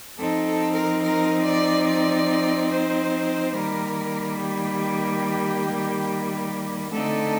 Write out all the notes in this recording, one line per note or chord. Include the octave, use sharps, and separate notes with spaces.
F3 C4 D#4 A4
A4
A#4
A#4
D5
D5
C5
D#3 G3 A#3 A#4
G4
D3 A3 C4 D#4 A4